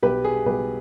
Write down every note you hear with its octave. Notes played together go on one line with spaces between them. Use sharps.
B1 G4 B4
G#4
B1 G4 B4